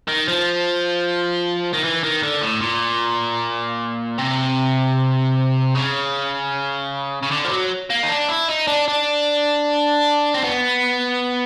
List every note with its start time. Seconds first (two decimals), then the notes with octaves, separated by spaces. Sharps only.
0.08 D#3
0.28 F3
1.74 D#3
1.84 E3
2.04 D#3
2.23 D3
2.42 A2
2.62 A#2
4.18 C3
5.75 C#3
7.23 C#3
7.31 D3
7.44 F3
7.50 F#3
7.90 A#3
8.03 D#4
8.09 D4
8.29 E4
8.48 D#4
8.67 D4
8.88 D4
10.34 C4
10.44 B3